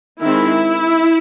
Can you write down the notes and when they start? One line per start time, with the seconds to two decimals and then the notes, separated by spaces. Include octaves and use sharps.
0.20 D#3 G#3 C4 E4